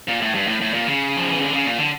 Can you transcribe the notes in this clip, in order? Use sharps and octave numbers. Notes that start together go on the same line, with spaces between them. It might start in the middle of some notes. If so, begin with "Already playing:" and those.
A#2
A2
G2
A2
A2
A#2
C#3
F3
E3
D3
C#3
A#2
D3